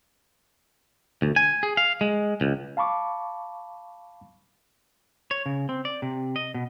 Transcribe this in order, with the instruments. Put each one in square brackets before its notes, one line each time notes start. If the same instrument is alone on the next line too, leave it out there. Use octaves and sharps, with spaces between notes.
[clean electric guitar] D2
G#5
G#4
F5
G#3
C#2
[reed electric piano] F5 A5 B5 C#6 D6
[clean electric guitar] C#5
C#3
C4
D5
C3
D#5
B2